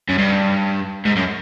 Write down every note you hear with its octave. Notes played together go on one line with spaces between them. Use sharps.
F#2
G2
G#2
F#2